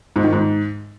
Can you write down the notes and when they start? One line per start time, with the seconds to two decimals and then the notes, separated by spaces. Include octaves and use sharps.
0.16 G#2
0.24 D#3
0.33 G#2